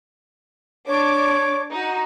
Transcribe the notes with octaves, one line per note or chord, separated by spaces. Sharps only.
D4 C#5 D6
D#4 F#4